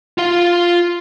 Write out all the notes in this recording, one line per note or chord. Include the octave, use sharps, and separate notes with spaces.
F4 F5